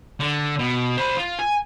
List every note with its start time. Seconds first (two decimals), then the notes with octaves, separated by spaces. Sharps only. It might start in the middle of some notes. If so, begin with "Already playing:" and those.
0.20 D3
0.59 B2
0.98 C5 B5
1.17 F4
1.39 G#5